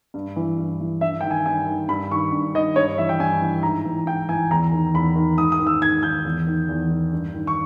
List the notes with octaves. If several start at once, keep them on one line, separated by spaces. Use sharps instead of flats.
G2
E3
G2
E3
G2 E5
D#3 G5
G#5
G2 G#5
D#3
G2 B5
D#3 C#6
G2
D#3 D#5
G2 C#5
E3 E5
G5
G2 G#5
E3
G#2 A#5
E3
G#2 G5
E3 G#5
E2 A#5
D#3
E2 B5
D#3
G#2 D#6
D#6
D#3
E6
G#2 G#6
D#3 G6
E2
D#3
E2
D#3
G2
D#3
C#6